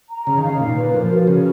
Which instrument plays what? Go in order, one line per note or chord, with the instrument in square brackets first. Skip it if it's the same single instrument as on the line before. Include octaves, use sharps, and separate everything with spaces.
[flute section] A#5
[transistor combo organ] C#3 [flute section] G#4
[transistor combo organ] D#3
[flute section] F5
[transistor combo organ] C#3
[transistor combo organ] A#2 [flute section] D#4
[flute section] B4
[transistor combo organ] F3 [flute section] A#4
[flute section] F#4
[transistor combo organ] C#3 [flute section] F#4